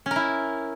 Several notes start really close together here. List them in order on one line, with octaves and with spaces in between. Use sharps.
C#4 A#4 E4